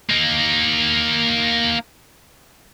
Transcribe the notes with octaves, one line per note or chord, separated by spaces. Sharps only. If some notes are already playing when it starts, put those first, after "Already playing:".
A#3 D#4